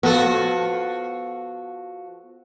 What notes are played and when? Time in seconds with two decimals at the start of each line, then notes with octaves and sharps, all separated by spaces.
0.03 F3 B3 F#4 A4